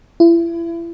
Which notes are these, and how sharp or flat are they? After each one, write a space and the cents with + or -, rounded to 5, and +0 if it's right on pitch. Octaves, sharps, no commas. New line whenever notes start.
E4 +35